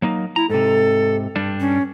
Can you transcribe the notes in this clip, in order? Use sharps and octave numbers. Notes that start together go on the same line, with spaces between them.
F#3 A#3 D#4
E4 A#5
G#2 C3 A4
G2 G3 D4
C#4